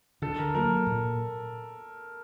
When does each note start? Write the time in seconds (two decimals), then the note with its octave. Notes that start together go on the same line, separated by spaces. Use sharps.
0.22 D3 A4
0.38 A#4
0.54 F#3 A#3 A#4
0.86 A#2